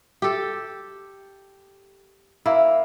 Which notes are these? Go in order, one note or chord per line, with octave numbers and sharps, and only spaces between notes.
G4 A4
A#3 E4